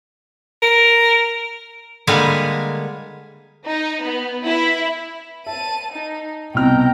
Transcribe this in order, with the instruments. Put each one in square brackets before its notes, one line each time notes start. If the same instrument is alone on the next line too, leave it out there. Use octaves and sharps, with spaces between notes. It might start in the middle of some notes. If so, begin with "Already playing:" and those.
[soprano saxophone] A#4
[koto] D3 G3 G#3 A#3 B4 G#5
[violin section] D#4
B3
E4
[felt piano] E5 [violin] A5 D#7
[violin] D#4
[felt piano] C2 B2 F6 [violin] G5 A#5